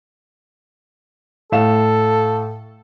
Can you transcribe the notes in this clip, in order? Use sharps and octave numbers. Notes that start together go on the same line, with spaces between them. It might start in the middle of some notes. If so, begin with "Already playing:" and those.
A2 A4 F5 E7